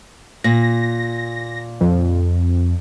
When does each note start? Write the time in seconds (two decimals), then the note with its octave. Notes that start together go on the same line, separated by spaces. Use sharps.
0.44 A#2 A#6
1.81 F2